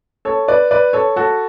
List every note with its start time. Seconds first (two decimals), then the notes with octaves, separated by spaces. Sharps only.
0.25 A4 C#5
0.48 B4 D5
0.71 B4 D5
0.93 A4 C#5
1.16 F#4 A4